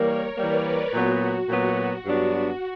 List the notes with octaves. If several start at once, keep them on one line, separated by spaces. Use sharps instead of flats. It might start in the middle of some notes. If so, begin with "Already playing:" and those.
Already playing: E3 G3 A#3 A#4 C#5
E3 G3 A#3 B4 D5
A#2 F#3 B3 F#4
A#2 F#3 B3
G2 F#3 B3 D4